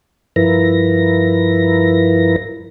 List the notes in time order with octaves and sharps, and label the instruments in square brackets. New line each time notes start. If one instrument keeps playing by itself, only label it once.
[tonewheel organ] G2 F3 E4 A#4 B4 A#6